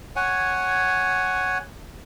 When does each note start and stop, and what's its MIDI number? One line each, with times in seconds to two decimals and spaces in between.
0.16 1.58 73
0.16 1.58 78
0.16 1.58 80